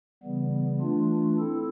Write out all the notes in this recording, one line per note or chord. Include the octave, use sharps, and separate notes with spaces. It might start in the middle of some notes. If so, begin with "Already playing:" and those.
C#3 E3 G3 B3
E3 A3 D4 F4
C4 E4 A4